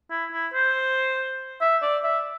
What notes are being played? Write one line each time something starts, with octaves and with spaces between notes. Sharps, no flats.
E4
E4
C5
E5
D5
E5